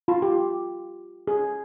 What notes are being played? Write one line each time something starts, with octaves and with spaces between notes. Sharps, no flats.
F4
G4
G#4